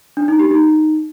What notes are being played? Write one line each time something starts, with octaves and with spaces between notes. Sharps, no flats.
D4
D#4
G4
D#4